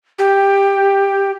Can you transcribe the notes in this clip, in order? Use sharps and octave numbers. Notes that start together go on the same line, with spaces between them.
G4